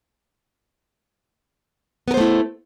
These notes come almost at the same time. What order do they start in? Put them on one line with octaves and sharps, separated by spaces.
B3 A#4 C5 A3 E4